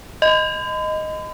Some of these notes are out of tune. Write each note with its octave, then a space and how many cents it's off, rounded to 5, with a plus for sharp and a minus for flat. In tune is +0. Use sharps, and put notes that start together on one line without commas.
D#5 +0 B5 +45